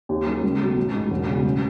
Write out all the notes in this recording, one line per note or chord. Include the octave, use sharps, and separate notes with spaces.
D#2
D#3 F#3 C#4 G#4
C#2
B2 F#3 A3
A1
G#2 D#3
E1
E2 C#3
A1